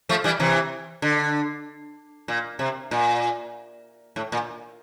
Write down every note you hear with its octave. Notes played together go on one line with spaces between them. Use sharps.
F3 A3
E3 G3
C3 E3
D3
A#2
C3
A#2
A2
A#2